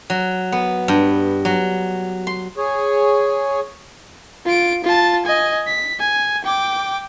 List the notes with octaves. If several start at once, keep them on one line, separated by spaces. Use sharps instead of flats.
F#3
B3
G2
F#3
C6
G#4 C#5
F4 D7
F4 A5
D#5 G#5
B6
G#5
G5 D6